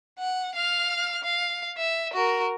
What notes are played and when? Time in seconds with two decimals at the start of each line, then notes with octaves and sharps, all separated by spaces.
0.19 F#5
0.55 F5 F6
1.23 F5
1.77 E5
2.14 F#4 A#4